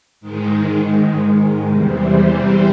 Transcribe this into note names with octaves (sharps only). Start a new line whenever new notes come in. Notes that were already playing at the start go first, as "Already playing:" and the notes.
G#2 D#3 G#3
E2 C3 E3 G3 C4